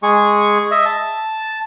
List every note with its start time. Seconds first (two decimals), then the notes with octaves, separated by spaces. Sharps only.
0.03 G#3 G#4 C#6
0.71 D#5 E5
0.86 A5